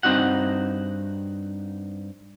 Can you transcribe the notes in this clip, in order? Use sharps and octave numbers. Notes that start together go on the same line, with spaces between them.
G2 C4 D#4 F#4 F#5